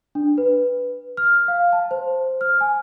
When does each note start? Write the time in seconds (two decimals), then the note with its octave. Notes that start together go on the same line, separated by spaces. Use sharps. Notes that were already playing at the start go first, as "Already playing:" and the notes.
0.15 D4
0.38 B4
1.17 F6
1.48 F5
1.72 A5
1.91 C5
2.41 F6
2.61 G#5